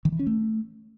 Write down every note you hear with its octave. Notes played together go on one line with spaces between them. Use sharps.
D#3
E3
C#4
A3